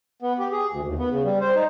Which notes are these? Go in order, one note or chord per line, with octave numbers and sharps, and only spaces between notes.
B3
G4
G#4
D2
D#2
B3
C#3
G3
C5
D#4